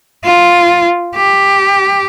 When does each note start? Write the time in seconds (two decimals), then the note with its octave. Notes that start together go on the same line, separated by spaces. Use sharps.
0.25 F4
1.15 G4